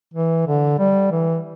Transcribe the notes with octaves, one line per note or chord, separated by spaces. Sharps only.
E3
D3
G3
E3